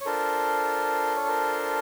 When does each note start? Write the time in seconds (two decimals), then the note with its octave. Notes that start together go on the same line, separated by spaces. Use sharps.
0.01 C#5
0.06 D4 F4 A4 A#4 C5
1.16 C#5
1.28 A#4 C5